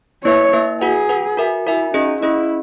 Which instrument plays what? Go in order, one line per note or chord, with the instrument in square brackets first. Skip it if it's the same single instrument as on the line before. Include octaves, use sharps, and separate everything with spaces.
[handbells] A#3 E4 B4 E5 [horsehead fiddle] C#5
[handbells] A#3 E4 B4 E5
[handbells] F#4 B4 F#5 [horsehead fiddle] G#4
[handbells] F#4 B4 F#5
F#4 A#4 E5 G#5
[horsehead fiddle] E4 [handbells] F#4 A#4 E5 G#5
[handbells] C#4 G#4 D#5 [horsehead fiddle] D#4
[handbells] C#4 G#4 D#5 [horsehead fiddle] E4